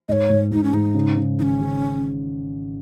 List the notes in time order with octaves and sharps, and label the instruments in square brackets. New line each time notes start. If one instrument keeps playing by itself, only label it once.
[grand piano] G#2 [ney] D#5
[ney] C#5
[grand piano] G#2
[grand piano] G#2 [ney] D#4
[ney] C#4
[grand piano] G#2 [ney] D#4
[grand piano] C#3
C#3
[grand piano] G#1 [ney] C#4 D#4
[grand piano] C#3